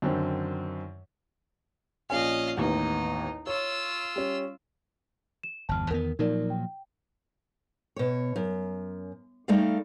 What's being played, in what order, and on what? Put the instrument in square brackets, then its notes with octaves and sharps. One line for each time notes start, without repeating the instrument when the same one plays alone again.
[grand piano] F#2 D3 D#3 C4
[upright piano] A#1 C#4 G#5 [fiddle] D#5 F5
[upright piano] A1 D#2 B3 [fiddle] D#4
[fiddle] F4 E6 [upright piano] C#5
[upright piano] G3 C#4
[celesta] E7
[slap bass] G1 E2 [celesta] A5 F6
[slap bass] E2 D#3 B3 [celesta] A#4
[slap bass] A#2 F3 F#3 [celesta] D#4 A#4 D5
[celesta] G5
[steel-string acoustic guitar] B2 C#5
F#2
G3 A3 D#4 A4 D5 F5